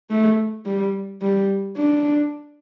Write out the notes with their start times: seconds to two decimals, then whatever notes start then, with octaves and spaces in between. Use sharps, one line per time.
0.10 A3
0.65 G3
1.22 G3
1.77 D4